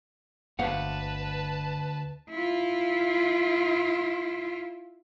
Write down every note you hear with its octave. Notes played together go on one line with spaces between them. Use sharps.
G1 D2 A#3 B4 F5 F#5 A5
E4 F4